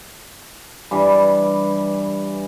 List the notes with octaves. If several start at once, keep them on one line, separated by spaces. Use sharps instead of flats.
G2 E3 G3